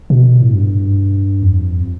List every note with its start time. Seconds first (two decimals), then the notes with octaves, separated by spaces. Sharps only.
0.10 B2
0.42 A2
0.54 G2
1.42 F2